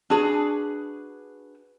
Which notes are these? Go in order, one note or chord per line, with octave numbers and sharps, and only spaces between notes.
D4 F#4 G#4 B4